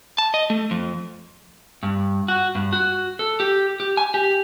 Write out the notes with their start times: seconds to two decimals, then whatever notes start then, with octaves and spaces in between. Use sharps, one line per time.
0.18 A5
0.34 D#5
0.50 A3
0.71 F2
1.83 G2
2.28 F#4
2.55 G2
2.73 F#4
3.19 A4
3.40 G4
3.80 G4
3.97 G#5
4.14 G4